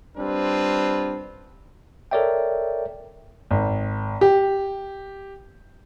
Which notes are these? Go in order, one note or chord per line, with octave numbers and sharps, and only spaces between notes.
G3 C4 D4 F4 B4
A4 A#4 C#5 D5 E5 G5
G#1
G4